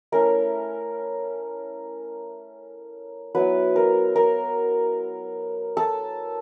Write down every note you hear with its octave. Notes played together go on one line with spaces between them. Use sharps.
A3 C#4 E4 A#4
F#3 B3 E4 B4
A#4
A#4
A4